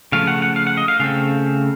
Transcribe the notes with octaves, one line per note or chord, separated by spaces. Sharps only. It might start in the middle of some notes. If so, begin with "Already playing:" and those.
C#3 F3 A3 F5
F#5
F#5
F5
F#5
D#5
F5
C#3 A3 C4 F5